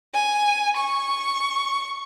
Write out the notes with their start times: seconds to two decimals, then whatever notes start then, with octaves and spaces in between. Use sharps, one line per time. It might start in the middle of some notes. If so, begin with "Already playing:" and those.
0.14 G#5
0.76 C#6